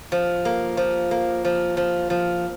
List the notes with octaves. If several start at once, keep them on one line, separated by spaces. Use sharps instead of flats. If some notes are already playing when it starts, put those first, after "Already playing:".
F3
A#3
F3
A#3
F3
F3
F3